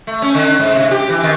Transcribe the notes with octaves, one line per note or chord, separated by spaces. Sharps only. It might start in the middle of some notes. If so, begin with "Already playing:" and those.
A3
C#4
D3
G#2
C3
G4
E3
D#3